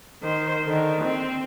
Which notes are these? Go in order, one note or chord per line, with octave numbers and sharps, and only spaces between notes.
D#3 C5
D3 D#3
C4